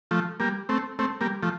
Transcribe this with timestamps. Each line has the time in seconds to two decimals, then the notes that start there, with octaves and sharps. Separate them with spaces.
0.11 F3 A3
0.40 G3 A#3
0.69 A3 C4
0.99 A3 C4
1.21 G3 A#3
1.43 F3 A3